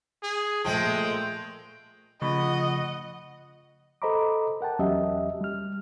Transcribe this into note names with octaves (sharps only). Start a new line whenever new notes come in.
G#4
A#2 F3 G#3 A3 G5
C#3 F3 A3 F4 D#5 F#5 B5 C#6
A4 C5 D#5 A#5 B5 D6
A#4 F#5 G5 A5
E2 F#3 C#4 G4 D#5 E5
G3 F6